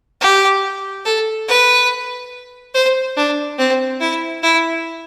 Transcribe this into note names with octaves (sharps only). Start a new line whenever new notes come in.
G4
A4
B4
C5
D4
C4
E4
E4